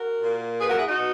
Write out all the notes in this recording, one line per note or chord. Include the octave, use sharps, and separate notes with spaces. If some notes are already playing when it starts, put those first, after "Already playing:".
Already playing: F#4 A#4
A#2 A#3
G#4 B4
F#4 A#4
E4 G#4
D#4 F#4
B2